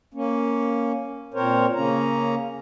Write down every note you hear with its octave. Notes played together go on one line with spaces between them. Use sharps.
A#3 C#4
A#2 C4 A#4 C5 C#5
C#3 A#3 C#4 A#5